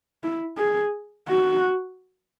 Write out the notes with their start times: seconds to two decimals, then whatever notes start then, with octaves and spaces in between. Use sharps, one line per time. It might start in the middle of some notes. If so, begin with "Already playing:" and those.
0.23 E4
0.58 G#4
1.28 F#4